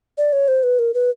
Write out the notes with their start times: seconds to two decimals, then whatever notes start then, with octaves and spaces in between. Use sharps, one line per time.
0.18 D5
0.33 C#5
0.48 C5
0.63 B4
0.79 A#4
0.94 B4